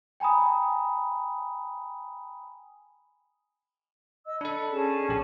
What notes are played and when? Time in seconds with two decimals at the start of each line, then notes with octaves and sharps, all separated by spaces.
0.20 G5 G#5 A#5 B5 D#6
4.26 D#5 E6
4.41 D4 A4 B5
4.71 C#4 G#4 A5
5.09 A#1 G4